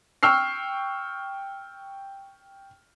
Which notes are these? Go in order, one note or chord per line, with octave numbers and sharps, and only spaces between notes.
G5 C#6 E6 F6 C7